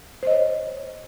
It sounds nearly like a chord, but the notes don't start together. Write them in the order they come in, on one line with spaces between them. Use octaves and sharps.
C5 D#5 C#5